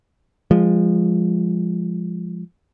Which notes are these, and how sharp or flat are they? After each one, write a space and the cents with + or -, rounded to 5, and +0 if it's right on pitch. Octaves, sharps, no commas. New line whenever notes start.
F3 +0 G#3 -15